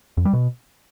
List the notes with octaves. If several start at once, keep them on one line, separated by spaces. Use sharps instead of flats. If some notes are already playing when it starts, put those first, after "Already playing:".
F2
G3
B2